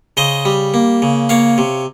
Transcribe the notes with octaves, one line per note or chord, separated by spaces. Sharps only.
C#3 C5 D#5
G3
A#3
C#3
A#3 C#5 F5
C3